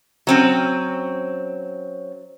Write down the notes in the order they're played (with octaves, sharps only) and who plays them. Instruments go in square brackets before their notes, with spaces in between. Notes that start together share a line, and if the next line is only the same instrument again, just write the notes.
[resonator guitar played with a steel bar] F#3 C4 C#4